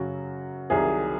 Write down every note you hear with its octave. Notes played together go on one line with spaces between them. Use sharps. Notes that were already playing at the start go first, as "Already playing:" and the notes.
Already playing: F#2 C#3 F#3 F#4
C2 C3 D#3 F#3 G#4